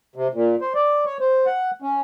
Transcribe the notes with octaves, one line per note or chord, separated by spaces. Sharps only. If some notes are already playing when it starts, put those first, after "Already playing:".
C3
A#2
C5
D5
C#5
C5
F#5
C#4